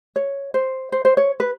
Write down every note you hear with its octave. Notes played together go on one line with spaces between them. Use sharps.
C#5
C5
C5
C5
C#5
B4